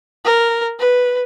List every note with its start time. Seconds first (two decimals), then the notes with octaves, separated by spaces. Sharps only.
0.25 A#4
0.79 B4